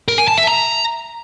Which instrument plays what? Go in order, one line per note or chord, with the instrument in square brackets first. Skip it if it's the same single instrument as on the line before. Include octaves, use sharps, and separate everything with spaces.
[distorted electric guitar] A#4
G#5
A5
E5
A#5